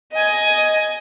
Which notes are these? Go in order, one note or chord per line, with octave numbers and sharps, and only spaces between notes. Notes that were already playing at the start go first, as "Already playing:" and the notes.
D#5 G#5